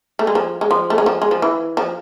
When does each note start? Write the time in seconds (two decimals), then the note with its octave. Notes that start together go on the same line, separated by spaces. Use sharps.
0.19 A3
0.27 G#3
0.35 F3
0.61 G#3
0.71 F3
0.90 A3
0.98 G#3
1.06 F3
1.22 G#3
1.31 F3
1.42 E3
1.77 F3